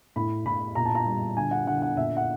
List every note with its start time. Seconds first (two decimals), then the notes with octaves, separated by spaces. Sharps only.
0.16 A2 B5
0.45 A2 B5
0.75 A#2 A#5
0.86 A5
0.95 A#5
1.06 G3
1.37 D3 G#5
1.51 F#5
1.67 D3 F#5
1.82 F#5
1.97 A#2 E5
2.17 F#5